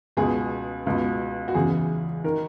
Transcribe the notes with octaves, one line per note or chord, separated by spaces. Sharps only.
C#2 B2 G#4
C#2 B2
F#4
E2 C#3 E3 G#4
D#3 A#4